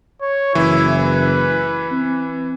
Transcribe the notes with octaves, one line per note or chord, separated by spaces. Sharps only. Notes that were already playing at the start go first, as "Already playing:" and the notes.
C#5
F#1 E3 E4
B4
C4